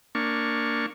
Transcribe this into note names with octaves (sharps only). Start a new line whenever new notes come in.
A#3 D4 C#6